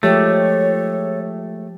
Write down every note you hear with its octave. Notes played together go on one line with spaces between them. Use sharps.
F3 G#3 A3 G4 C#5